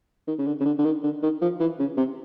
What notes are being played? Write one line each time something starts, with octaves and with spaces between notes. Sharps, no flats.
D#3
C#3
D3
C#3
D3
D3
D#3
D3
D#3
F3
E3
C#3
C3